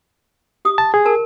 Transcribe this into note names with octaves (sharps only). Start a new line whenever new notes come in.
G4 D#6
A5
G#4
A#4 A5